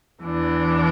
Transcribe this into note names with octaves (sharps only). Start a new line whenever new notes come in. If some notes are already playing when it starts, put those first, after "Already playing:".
E2 E3 D4